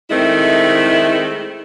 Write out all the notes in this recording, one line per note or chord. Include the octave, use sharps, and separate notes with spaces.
D#3 G#3 A3 C4 E4